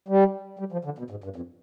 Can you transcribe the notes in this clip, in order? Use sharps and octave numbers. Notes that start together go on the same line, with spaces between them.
G3
G3
F3
D3
B2
G#2
G2
F2